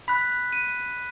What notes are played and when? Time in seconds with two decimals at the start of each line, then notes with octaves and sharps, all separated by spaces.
0.08 B5 F#6 B6
0.52 D#7